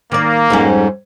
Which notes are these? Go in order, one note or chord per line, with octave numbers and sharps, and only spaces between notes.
D#3 A#3 D5
F2 G#2 G3 C#4